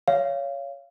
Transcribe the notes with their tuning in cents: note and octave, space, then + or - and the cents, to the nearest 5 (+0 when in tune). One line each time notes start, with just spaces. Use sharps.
C#5 +10 F5 -20